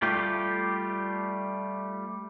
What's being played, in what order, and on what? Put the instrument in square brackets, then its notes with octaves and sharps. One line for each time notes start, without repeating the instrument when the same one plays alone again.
[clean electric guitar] G3 A3 F4 G4